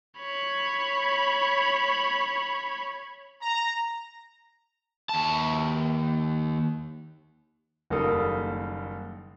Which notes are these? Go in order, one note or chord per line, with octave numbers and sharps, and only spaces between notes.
C#5 B5
A#5
D#2 A5
F#1 D#3 G3 A#3 A4 D#6